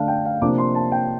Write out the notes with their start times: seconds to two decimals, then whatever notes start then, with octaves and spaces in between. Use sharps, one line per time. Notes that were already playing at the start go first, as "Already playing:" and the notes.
Already playing: D3 A3 D4 F5 A5
0.08 G5
0.25 F5
0.41 C3 F3 A#3 D4 D6
0.58 C6
0.75 A5
0.92 G5